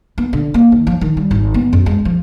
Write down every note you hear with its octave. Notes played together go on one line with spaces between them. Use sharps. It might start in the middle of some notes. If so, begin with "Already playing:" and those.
B3
D3
A#3
D#3
F3
D#3
G3
G#1
B3
F#2
G#3
F3